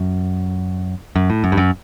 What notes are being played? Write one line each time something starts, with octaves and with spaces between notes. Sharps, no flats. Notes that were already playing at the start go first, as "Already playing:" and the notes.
Already playing: F#2
F#2
A2
F#2
G2
F#2